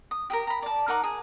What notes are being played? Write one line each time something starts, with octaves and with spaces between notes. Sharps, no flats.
D#6
G4 G#4 A#4
A#5 B5
D5 A5
D#4 A#4 F#5 D6
G#4